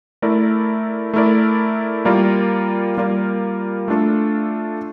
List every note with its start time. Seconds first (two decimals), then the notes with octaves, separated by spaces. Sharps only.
0.22 A3 E4 A#4 D5
1.14 A3 E4 A#4 D5
2.05 G3 A#3 F4 A#4 D5
2.98 G3 A#3 F4 A#4 D5
3.88 A3 D4 F4 A4